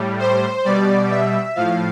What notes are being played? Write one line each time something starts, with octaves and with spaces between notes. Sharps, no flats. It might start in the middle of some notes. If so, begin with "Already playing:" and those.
Already playing: A2 G3
C5
B2 G3 D5
E5
A2 F3 F5